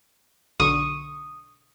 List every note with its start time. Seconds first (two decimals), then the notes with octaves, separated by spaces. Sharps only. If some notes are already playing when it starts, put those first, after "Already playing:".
0.60 B1 D3 C#6 D#6